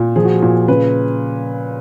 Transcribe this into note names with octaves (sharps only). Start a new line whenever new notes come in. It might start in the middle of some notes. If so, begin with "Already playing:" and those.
Already playing: A#2
F3 G#4
F#4
G#4
A#2
C#3 B4